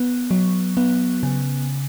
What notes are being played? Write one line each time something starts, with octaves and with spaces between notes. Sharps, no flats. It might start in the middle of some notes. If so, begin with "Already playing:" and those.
Already playing: B3
F#3
B3
C#3